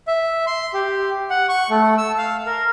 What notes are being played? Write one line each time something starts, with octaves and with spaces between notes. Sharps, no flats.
E5
C6
G4
F#5
C#6
A3
E6
F5
A#4